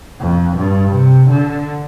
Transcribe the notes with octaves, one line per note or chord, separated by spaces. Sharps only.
F2
G2
C3
D3